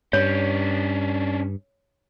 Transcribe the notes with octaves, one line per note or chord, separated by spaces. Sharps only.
G2 C#4 D4 C#5